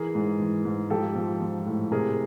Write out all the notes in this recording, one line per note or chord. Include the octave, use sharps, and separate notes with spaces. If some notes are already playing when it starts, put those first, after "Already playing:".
Already playing: E3 G#4 A#4
G#2
E3
G#2
F3 G4 A4
F3
F3
A2
C3 G#4 A#4